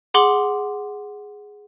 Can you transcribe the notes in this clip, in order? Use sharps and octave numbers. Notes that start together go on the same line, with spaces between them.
G#4 F#5 C6 D6 F#7 G7